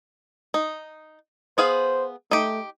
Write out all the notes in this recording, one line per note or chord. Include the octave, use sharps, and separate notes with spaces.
D#4
B3 G#4 C5 F5
A3 D#4 G4